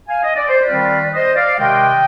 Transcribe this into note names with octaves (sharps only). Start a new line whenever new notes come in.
F5 G#5
D#5
D5
C5
B4 D5
D#3 G3 C4 F4
C5 D#5
D5 F5
C3 D#3 G#3 D4 D#5 G5